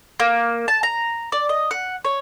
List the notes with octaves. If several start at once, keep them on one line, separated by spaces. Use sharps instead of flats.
A#3
A5
A#5
D5
D#5
F#5
C#5